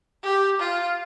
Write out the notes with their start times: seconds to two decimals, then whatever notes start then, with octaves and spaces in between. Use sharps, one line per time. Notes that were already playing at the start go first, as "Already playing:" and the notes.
0.24 G4
0.60 F4